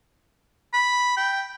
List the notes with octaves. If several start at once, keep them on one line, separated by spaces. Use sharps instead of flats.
B5
G5